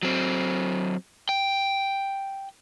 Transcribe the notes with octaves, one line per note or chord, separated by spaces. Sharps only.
F#3 C4
G5